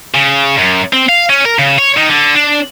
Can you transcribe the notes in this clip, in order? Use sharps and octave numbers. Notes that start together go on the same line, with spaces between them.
C#3
F#2
C4
F5
C#4
A#4
C#3
C#5
D#3
D3
D4